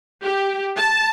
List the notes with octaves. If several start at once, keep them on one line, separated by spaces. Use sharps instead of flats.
G4
A5